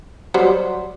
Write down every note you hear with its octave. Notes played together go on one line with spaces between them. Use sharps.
F#3 G3 C5